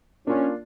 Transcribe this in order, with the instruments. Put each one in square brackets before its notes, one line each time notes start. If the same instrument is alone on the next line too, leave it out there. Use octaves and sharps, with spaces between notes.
[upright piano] A#3 D4 F4 [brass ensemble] C#4